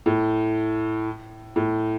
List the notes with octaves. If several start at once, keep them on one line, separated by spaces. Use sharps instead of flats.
A2
A2